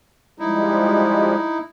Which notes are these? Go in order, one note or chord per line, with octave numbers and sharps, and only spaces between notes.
F3 G3 G#3 D#4 E4